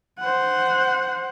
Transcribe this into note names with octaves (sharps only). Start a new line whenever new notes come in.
C5 F#5